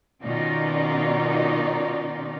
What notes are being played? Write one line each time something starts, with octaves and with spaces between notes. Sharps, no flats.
B2 D#3 C#4 D#4 F4 D5